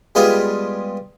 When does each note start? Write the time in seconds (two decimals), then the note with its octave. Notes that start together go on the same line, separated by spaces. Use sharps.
0.15 G3 G#3 B3 F4 G#4